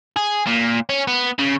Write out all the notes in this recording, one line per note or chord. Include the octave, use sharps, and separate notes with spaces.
G#4
A#2
C#4
B3
C#3